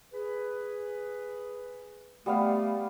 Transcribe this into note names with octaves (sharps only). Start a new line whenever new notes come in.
G#4 B4
G3 A3 B3 F5